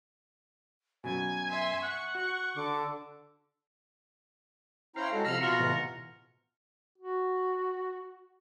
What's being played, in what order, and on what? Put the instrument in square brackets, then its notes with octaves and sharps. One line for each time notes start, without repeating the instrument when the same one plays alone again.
[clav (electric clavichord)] F#2 B2 [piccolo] G#5
[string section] E5 C6
[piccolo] F#5 [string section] C#6
[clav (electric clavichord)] F#4 [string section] C#6
[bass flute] D3 [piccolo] D6
[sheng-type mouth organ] C#4 C5 [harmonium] E4 G5 A#5 [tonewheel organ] F5
[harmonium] G#3 A4 [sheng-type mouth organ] F#4
[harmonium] C3 F3 [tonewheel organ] F5 B5 [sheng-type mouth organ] E6 F6 [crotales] A#6 F7
[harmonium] B2 [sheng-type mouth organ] F4 F#4 A#5 [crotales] F6 A#6 C#7
[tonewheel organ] A2 C3 E3
[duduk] F#4